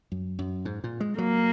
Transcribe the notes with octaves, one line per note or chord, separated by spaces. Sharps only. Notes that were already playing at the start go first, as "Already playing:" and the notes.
F#2
F#2
G#2
A#2
G#3
F#3 A#3